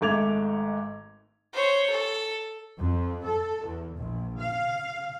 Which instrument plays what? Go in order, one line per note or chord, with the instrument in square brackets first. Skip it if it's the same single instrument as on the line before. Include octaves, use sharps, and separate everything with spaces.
[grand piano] G#1 G#2 A3 D6 G#6 F7
[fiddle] C5 C#5
A4
[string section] F2
A4
E2
A#1
F5